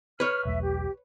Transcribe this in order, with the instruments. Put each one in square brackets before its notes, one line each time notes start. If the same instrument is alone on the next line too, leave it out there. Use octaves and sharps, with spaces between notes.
[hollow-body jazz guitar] B4 C#5 [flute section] F6
[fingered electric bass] B1 E2 A3 [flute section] E5
[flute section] G4